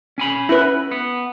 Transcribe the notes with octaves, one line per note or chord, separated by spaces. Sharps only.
C#4 G#5 B5
E4 B4
B3